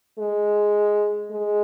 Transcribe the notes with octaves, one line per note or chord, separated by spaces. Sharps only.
G#3
G#3